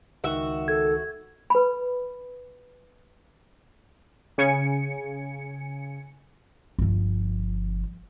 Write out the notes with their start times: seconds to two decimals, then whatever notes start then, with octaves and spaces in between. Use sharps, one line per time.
0.24 C#2 D#3 F#4 E5 C#6
0.68 A4 G#6
1.50 B4 B5
4.38 C#3 G#5 C#7
6.79 G1 F3